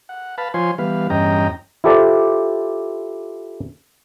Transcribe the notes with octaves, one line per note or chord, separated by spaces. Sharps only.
F#5
B4 F5 A5 B5
F3 F4 C5 C#5 G#5 C6
E3 G3 B3 B4 F5
E2 G2 C#4 D#5 G5 A#5
E4 F4 G4 A4 C5 D5